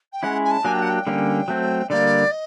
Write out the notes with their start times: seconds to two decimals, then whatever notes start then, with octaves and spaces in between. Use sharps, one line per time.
0.12 G5
0.23 G#3 C#4 E4 F#5
0.44 G#5
0.51 A5
0.65 F#3 A#3 D4 G4 G#5
0.73 G5
0.82 F#5
0.89 G5
1.07 D3 G3 A#3 C#4
1.48 F#3 A3 C4
1.89 D3 G3 A#3 D5
2.31 D#5